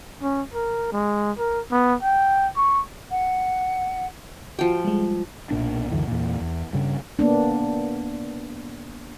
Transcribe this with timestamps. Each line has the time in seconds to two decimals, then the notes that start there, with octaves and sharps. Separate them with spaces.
0.22 C#4
0.54 A#4
0.92 G#3
1.38 A#4
1.72 B3
2.03 G5
2.57 C#6
3.11 F#5
4.59 F3 F#4 G5
4.85 G3 G#3
5.51 B1 A#2 D4
5.91 C#2 F#2 D3 E3
6.07 E2 A#2
6.40 E2
6.73 G2 C#3
7.19 A#3 B3 D4